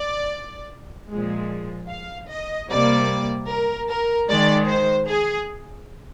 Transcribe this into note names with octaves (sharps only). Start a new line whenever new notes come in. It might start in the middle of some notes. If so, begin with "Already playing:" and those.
Already playing: D5
A#2 F3 G#3
F5
D#5
C3 G3 A#3 D5
A#4
A#4
D#3 G#3 D5
C5
G#4